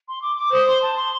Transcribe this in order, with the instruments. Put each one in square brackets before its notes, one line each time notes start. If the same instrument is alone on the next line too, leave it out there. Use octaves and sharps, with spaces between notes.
[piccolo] C6
D6
D6
[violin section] C5 [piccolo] D#6
[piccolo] C6
A5
C6